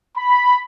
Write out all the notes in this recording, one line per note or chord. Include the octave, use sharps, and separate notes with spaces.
B5